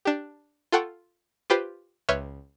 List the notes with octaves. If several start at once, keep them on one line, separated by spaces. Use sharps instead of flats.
D4 G4
F4 A4 F#5 G5 C#6
F4 G4 B4 C5
C#2 B4 C#5 E5 F6 G6